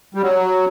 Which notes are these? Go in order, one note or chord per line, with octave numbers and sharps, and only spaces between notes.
G3
F#3